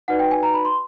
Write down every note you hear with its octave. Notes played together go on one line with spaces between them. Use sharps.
D#4 F#4 B4 D5 F#5
G5
G#5
A#5
B5
C6